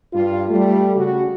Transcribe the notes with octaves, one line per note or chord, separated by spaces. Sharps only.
G2 F4
G3 A3
C#3 F#4